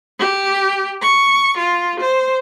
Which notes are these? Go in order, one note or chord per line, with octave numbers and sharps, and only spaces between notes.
G4
C#6
F4
C5